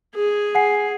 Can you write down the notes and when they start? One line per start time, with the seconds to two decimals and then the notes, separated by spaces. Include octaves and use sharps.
0.15 G#4
0.55 F#5 G#5 C7